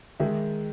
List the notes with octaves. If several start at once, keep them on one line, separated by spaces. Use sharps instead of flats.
D#3 G#3 E5